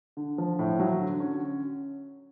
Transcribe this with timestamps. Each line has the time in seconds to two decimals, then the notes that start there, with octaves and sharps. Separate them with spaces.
0.17 D3
0.38 F3
0.59 A2
0.79 F#3
1.00 D3
1.20 C#4